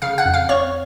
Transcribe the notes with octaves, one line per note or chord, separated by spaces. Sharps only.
C#3 F5 F6
F#5 F#6
F2
F5 F6
C4 C#5 C#6